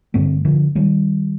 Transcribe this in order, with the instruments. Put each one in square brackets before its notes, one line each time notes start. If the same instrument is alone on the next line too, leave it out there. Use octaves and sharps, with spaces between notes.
[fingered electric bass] G2 D3 A3 C4
D3 F3
D#3 G3